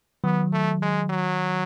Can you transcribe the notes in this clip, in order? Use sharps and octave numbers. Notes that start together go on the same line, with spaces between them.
D#3 F#3 B3
A3
G#3
F#3